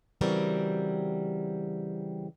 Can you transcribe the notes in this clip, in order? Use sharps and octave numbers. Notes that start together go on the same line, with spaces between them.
C#3 E3 G3 C4 F#4 A#4